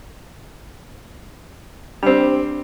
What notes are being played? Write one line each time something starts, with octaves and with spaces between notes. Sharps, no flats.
G3 C4 D4